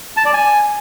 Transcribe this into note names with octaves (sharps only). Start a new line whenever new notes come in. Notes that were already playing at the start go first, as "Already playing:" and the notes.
A5
D5
G#5